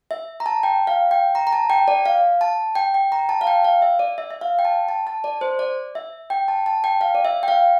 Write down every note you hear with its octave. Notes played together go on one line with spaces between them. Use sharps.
E5
A#5
A5
G5
F5
G5
A#5
A#5
A5
G5
D5
F5
A5
G5
G5
A#5
A5
F5
G5
F5
E5
D5
E5
E5
F5
G5
A5
A5
A5
D5
C5
D5
E5
G5
A5
A5
G5
F5
D5
E5
G5
F5